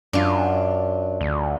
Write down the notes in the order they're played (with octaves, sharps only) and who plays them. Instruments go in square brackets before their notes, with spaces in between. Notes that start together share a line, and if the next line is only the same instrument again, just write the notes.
[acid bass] F#2 [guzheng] D4 F4
[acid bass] D2